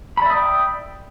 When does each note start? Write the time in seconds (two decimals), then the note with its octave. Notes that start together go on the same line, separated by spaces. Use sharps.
0.17 B5
0.22 D5
0.26 E5
0.30 D#6
0.34 G5